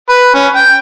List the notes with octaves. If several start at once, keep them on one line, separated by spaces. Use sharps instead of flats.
B4
C#4
G5